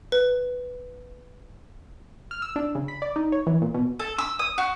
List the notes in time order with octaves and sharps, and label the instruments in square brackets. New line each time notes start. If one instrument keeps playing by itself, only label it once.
[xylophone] B4
[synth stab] F6
E6
D4
C#3
B5
D5
D#4
C#5
E3
A#2
B2
[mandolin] A4
E6
D#6
F#4